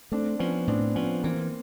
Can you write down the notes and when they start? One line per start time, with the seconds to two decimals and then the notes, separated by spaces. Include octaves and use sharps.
0.12 A3 C4 D4
0.39 F3 B3 C#4
0.67 A2 C4 D4
0.95 F3 B3 C#4
1.23 E3 A#3 C4